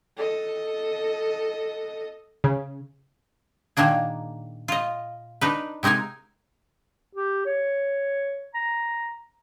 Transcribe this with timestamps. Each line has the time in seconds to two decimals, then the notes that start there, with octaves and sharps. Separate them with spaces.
0.17 A4 D#5
2.44 C#3
3.77 A#2 D#3 A#3 D4 G#4
4.68 F4 D#5
5.41 D4 D#4 B4
5.83 C3 G#3 D#4 A#4 G#5
7.15 G4
7.46 C#5
8.55 A#5